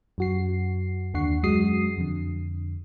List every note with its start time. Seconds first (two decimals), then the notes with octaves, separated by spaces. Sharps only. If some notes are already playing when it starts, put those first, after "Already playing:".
0.18 F#2 F#4 C7
1.14 D#2 D3 D4 F#5 C#6 C7
1.43 F#2 G#3 F#4 D#6 C7
1.98 F2 D3